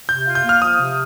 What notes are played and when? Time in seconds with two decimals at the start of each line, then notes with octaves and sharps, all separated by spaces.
0.09 C3 G6
0.27 F4
0.35 G6
0.44 A#3
0.49 F6
0.61 F3 D#6
0.80 C3